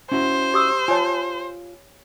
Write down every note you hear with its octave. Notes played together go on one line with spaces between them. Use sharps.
C#4 E4 F#4 C5
G4 D#6 E6
F4 C#5 G#5 A5